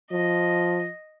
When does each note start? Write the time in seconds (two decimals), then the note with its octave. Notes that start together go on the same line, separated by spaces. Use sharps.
0.11 F3 D#5